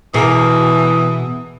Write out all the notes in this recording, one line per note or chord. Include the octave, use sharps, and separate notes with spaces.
B2 E3 G#4 A#4 D6 D#6